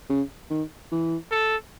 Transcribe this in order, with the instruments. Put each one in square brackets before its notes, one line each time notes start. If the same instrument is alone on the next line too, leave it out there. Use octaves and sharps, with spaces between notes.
[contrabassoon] C#3
D#3
E3
[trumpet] A4